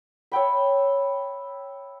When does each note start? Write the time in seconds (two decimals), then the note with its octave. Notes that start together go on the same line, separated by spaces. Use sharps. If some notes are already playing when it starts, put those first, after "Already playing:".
0.32 C#5 E5 G5 B5